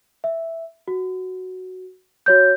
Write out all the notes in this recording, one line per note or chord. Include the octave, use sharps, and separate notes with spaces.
E5
F#4
F#4 C#5 G6